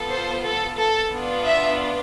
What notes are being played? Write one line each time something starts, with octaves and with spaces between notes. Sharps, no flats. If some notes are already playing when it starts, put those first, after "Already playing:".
Already playing: B3 F4 A4
C5
A4
A4
B3 D4 F4
E5